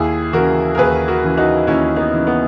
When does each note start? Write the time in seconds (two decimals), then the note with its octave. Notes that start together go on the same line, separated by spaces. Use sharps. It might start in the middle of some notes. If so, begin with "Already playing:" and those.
Already playing: D#2 E4 G#4
0.33 C#3 E3 F#4 A#4
0.75 A#4
0.78 D#2 G#4 B4
1.08 F#4 A#4
1.23 C#3 E3
1.37 D#4 F#4
1.67 D#2 C#4 E4
1.96 B3 D#4
2.12 C#3 E3
2.27 B3